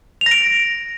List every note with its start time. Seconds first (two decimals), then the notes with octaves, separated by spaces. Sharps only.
0.21 F7
0.26 A#6
0.31 D7